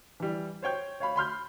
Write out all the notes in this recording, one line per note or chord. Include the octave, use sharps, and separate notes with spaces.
E3 G3
C5 C#5 G5 G6
C#5 F5 B5
B5 C6 F6 G6